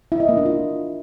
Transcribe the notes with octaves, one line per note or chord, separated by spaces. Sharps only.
E4
D#5
A#3
D4
F4